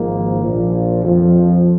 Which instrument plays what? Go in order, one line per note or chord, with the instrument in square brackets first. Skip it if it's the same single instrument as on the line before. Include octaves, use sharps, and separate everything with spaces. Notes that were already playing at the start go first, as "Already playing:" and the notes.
Already playing: [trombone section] G#1 G#2 F3 A#3
A#1 A#2 F3
F2 F3